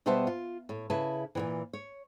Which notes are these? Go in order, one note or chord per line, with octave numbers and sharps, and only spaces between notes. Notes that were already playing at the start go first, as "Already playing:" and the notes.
B2 G3 B3 C5 E5 A5
F4
A2
C#3 E4 B4 A5
A#2 D#3 E3
C#5